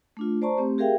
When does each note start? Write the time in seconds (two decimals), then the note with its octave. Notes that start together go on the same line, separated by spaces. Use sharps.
0.17 A3 D4 F4
0.42 C5 D5 A5 A#5 C#6
0.57 A3 C4 G4
0.78 G4 G#4 A#4 E5 F5 G5